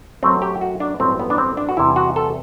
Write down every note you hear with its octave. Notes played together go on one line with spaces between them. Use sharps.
F#2 F#3 A3 C4
G4
F#4
D4
A1 G2 F#3 C4
B3
D4
C4
D4
F#4
E2 C3 G3 E4
F#4
A4